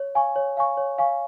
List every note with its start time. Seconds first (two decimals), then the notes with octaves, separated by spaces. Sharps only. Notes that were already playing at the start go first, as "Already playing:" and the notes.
Already playing: C#5
0.15 F5 G#5 C#6
0.36 C#5
0.57 F5 G#5 C#6
0.77 C#5
0.98 F5 G#5 C#6